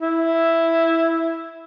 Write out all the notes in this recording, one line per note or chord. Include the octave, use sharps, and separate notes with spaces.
E4